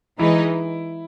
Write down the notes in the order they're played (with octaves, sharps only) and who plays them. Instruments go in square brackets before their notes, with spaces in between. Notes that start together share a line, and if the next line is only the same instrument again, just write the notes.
[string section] E3 G#3 D#4 [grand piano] E4